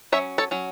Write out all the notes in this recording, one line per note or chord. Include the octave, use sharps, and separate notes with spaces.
F#3 C#4 C#5 E5
A4 C#5
F#3 C#4